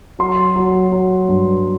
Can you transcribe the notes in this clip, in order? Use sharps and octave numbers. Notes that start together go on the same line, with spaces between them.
F#3 C6
F#3
F#3
G2